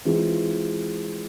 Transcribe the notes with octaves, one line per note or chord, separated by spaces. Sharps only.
E3 G#3 C4 F4